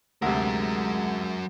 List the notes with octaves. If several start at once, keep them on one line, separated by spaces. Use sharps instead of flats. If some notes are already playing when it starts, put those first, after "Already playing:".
D2 C3 F#3 G#3 A#4